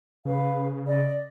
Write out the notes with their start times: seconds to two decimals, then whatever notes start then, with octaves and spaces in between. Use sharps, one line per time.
0.25 C#3 B4 F5
0.86 D5 D#5